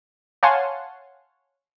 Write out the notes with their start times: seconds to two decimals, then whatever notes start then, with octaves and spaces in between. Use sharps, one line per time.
0.43 C#5 F5 F#5 G#5 A5 C6